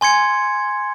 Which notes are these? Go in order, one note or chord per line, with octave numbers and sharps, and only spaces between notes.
G#5 C6 G#6 C#7